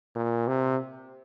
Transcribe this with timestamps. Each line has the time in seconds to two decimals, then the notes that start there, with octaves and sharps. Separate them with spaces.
0.16 A#2
0.48 C3